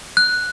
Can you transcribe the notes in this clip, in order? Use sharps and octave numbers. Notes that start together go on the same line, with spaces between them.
F#6